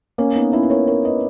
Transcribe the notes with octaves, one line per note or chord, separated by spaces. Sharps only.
A#3 C#4
B3 D#4
C#4 E4
B4
A#4 C#5
A#4 C#5
B4 D#5